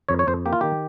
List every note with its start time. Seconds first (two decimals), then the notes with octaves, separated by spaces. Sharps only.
0.09 F2 C#5
0.19 C#5
0.27 F2 C5
0.46 A#3 G4
0.53 F4
0.61 D#3 G4